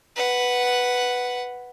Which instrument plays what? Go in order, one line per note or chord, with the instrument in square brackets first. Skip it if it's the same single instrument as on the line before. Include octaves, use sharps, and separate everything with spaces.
[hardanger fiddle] B4 F#5